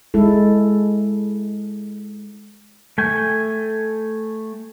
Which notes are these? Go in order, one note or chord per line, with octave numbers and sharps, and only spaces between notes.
G#3 E4 A4
A3 G5 G#5